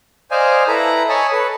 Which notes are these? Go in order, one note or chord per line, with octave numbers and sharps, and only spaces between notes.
C5 D5 D#5 F5 G#5
E4 A4 B4 A#5
C#5 D#5 G#5 A5 B5
A4 B4